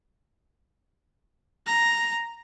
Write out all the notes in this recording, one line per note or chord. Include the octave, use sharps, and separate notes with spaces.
A#5 A#6